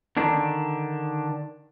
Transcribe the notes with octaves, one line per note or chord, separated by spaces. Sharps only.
D3 D#3 D4